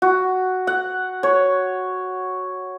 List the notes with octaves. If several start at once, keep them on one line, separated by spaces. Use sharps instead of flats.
F#4
F#5
C#5